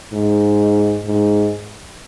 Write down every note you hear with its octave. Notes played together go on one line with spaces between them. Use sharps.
G#2
G#2